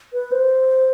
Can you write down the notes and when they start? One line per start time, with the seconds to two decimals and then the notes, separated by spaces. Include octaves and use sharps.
0.13 B4
0.32 C5